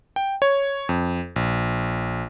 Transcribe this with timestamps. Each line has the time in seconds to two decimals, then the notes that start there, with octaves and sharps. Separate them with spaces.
0.16 G5
0.42 C#5
0.89 F2
1.36 A#1